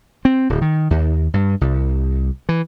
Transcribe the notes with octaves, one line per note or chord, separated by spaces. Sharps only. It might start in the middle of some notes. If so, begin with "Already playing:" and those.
C4
D1
D#3
D#2
G2
C2
E3